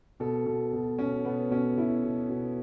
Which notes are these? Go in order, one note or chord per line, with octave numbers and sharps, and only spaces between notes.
B2 A4
B2
B2
B2 C#4
B2 B3
B2 C#4
B2 E4
B2
B2